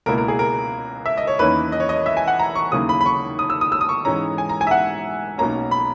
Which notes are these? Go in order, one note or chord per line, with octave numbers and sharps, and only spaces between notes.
C#2 B2 A#3 E4 A#4
A#4
G#4
A#4
E5
D#5
C#5
E2 D#3 A#3 C#4 E4 B4
D#5
C#5
D#5
E5
G#5
F#5
A#5
C#6
D#2 C#3 F#3 A#3 E4 D#6
B5
B5
C#6
D#6
E6
D#6
E6
D#6
C#6
G#2 E3 G#3 C#4 A#5
G#5
A#5
G#5
E5
F#5
B1 B2 A#3 C#4 A#5
B5